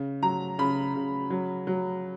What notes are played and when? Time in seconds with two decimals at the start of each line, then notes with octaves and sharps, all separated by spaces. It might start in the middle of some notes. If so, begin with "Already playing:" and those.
Already playing: C#3
0.22 F#3 A#5
0.59 C#3 B5
0.95 C#3
1.30 F#3
1.67 F#3